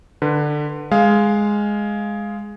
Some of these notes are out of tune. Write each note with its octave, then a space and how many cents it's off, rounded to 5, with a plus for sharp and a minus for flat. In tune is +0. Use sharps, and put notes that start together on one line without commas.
D3 +20 B4 +0
G#3 +0 F5 +0